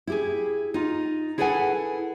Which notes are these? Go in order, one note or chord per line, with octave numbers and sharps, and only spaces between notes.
E4 G4 G#4
D#4 F4
E4 G#4 A4 B4 F#5 G#5